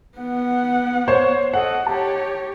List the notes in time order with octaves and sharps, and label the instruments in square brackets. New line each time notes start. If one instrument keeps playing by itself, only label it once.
[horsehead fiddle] B3 F#5
[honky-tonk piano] C5 C#5
[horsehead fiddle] A4 D#5 [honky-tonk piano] F#5
[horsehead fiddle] G4 C#5 [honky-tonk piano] A5